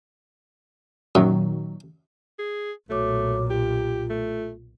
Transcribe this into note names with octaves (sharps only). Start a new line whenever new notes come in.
F#2 A#2 D#3 F#3
G#4
B1 A#2 A3 F#4 C#5 D6
F4 G4
A3